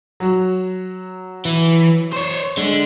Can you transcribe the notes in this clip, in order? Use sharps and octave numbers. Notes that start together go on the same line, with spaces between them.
F#3 F#4
E3
C5 C#5
D3 G#3